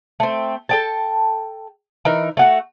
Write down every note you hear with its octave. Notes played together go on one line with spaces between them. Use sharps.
A3 C4
A4 G5 A5
E3 D#4 A#4
A3 F#4 F#5